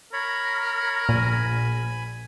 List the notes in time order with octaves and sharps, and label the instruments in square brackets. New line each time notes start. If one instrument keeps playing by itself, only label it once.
[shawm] A#4 [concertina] C#5 B5
[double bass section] A#1 [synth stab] A#2 [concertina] G#5 B5